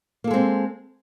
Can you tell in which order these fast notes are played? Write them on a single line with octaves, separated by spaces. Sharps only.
A#3 A4 G#3 C4